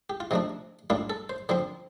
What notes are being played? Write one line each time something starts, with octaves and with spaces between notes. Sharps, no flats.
G4
F4
C3 F3 A3 D4 D#4
A2 G3 A#3 D4 F4
A4
C5
D3 F3 C4 C5